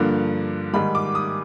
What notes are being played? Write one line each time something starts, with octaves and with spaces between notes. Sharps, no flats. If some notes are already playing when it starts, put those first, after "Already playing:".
Already playing: G2 D3 F3 A#3
G#2 D#3 G3 B5
D6
D#6